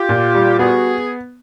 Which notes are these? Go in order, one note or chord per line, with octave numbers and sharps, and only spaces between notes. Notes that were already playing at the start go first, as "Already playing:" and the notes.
Already playing: F4 G4
A#2
G3
B3 F#4 G#4